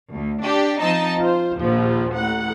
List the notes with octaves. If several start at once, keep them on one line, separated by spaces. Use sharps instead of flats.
D2
D4 G4
F3 C4 D#4 A5
F4 C5
A#1 D#2 A#2 F3
A1 F#5